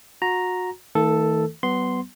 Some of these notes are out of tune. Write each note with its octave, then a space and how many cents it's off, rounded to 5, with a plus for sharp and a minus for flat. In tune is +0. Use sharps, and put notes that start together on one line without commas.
F#4 -30 A#5 +0
D#3 +40 A3 +30 A4 +0
F#3 +45 B3 +15 C6 -5